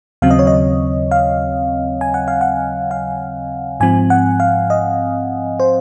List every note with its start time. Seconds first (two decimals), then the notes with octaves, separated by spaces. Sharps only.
0.22 D#2 C#3 F#3 C4 F5
0.31 D#5
0.39 C#5
0.47 D#5
1.11 F5
2.01 G#5
2.14 F#5
2.28 F5
2.41 F#5
2.91 F5
3.80 G#2 F3 C4 G#5
4.10 F#5
4.40 F5
4.70 D#5
5.60 C5